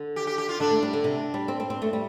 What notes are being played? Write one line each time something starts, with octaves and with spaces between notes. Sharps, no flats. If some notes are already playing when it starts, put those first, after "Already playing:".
Already playing: D3
G4
G4
G4
F4
D3 D4
A3
G3
D3
C3
G3
C4
C4
C4
A3
G3